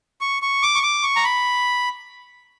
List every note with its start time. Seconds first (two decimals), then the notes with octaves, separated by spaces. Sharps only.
0.21 C#6
0.42 C#6
0.63 D6
0.75 C#6
0.83 D6
1.03 C#6
1.16 A#5
1.24 B5